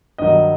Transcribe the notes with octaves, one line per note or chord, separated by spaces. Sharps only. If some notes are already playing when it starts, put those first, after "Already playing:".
G2 D#3 F#3 D#5